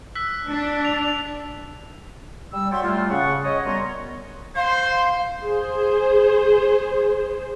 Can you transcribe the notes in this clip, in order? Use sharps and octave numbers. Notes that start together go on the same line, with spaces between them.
E6 F#6 B6
D4
F7
G3 E6
F#4 C#5 D5 E5 G5 C6
G3 A3 F4
C#3 F#5 C#6
C#5 D#5
F#2 G3 B3 C#5 A#5 C6
C5 F5
G#4 C5